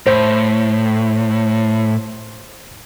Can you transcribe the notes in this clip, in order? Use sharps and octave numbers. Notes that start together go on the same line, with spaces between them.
A2 C5